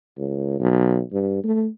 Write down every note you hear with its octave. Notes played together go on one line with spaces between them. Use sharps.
C#2
B1
G2
A3